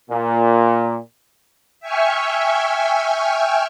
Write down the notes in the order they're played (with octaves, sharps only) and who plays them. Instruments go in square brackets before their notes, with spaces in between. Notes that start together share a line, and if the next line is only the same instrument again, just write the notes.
[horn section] A#2
[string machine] E5 G5 G#5 C#6 F6